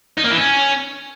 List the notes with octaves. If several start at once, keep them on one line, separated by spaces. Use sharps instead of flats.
D#4
A#3
E3
C#4